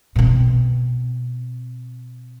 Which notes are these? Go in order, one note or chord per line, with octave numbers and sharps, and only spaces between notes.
B2 C4